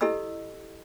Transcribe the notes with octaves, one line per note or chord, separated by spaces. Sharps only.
E4 G4 A4 D#5 B5 E6